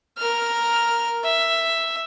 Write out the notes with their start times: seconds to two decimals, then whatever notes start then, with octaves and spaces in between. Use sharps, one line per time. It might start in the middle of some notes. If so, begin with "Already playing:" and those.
0.18 A#4 F6
1.24 E5